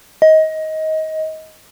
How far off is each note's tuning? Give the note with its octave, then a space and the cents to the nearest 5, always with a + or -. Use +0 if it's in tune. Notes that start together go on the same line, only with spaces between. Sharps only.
D#5 +20